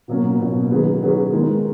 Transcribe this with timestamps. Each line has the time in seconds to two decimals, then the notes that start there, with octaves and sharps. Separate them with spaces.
0.08 B2 F#3 A#3 C#4
0.39 B2 F#3 A#3 C#4
0.71 D#3 F#3 C#4 G#4 B4
1.01 D#3 F#3 C#4 G#4 B4
1.32 D#3 G#3 D#4 A#4